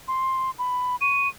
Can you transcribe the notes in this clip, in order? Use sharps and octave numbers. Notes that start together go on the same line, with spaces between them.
C6
B5
C#6 D#7